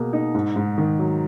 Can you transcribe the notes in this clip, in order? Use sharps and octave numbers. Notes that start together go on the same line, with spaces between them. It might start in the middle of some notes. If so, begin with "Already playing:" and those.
Already playing: B2 A#3 G#4
D#4
G#2
G#2
D#3
F#3